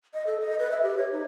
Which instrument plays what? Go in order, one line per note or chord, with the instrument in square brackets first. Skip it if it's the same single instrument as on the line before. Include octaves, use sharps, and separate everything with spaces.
[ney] D#5
A4
D#5
B4
E5
G4
C#5
D#4